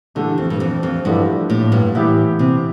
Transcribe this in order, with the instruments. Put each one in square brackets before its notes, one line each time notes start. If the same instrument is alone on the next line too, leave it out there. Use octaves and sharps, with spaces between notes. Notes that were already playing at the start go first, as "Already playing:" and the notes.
[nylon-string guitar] D3 [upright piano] E3 A3 D4 G4
[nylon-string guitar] F2
G2
F2
F2
[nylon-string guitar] G2 [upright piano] D3 F3 A3 E4 G4
[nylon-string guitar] A2
G2
[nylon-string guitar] A2 [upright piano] E3 B3 E4 G4
[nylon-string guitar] C3